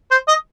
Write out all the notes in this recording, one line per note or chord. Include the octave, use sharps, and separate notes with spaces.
C5
D#5